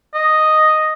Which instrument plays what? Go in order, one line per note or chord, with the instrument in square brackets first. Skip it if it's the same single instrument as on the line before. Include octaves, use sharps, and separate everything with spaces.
[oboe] D#5